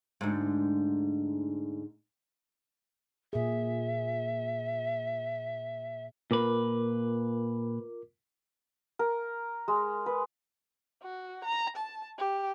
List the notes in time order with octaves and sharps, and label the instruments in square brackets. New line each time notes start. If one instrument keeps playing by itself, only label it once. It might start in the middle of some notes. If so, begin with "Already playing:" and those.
[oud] D2 G#2
[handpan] A#2 G#4 [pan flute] E5
[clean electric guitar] A#2 B4 [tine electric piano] F4 A#4 D6
[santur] A#4
G#3
B4
[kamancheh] F#4
A#5
A5
G4